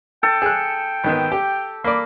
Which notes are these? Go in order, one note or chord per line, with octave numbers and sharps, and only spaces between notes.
A4 G5
G#4 F#6
G#1 D#3 B3
G4
A#3 D5 B5